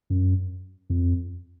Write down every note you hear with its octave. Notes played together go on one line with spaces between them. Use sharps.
F#2
F2